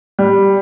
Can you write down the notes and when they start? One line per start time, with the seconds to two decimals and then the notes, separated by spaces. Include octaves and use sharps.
0.19 G3